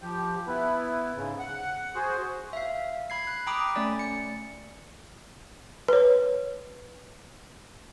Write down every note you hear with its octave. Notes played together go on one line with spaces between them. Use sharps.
F3 G4
B3 E4 B4
G#2 C#3
F#5
F#4 G#4 C5
E5 F5
B5 G#6 C7
F#6
G5 A#5 B5 D6 D#6
A3 C#4 D5 A6
C#7
B4 C#5